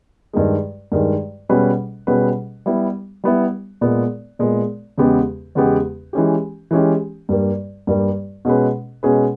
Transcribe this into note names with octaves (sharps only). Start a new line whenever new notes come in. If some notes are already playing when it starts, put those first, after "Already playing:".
G2 D#3 G#3
G2 D#3 G#3
B2 G3 C#4 G#4 B4
B2 G3 C#4 G#4 B4
G3 B3 E4
G3 B3 E4
A#2 G#3 B3
A#2 G#3 B3
E2 C#3 G#3 B3 G4
E2 C#3 G#3 B3 G4
E3 G#3 C#4 G4
E3 G#3 C#4 G4
G2 G3 A#3
G2 G3 A#3
B2 G#3 C#4 G#4 B4
B2 G#3 C#4 G#4 B4